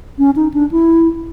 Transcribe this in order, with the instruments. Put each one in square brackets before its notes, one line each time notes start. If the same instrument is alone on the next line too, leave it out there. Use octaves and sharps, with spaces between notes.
[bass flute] C#4
D#4
D4
E4